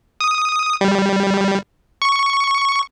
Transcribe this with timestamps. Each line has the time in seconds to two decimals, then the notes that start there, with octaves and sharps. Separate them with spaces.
0.20 D#6
0.81 G3
2.02 C#6